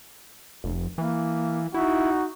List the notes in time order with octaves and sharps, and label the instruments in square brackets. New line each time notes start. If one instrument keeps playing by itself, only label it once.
[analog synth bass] F1
[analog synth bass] E3 [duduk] A#3
[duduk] D#4 [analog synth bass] E4 [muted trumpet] F#4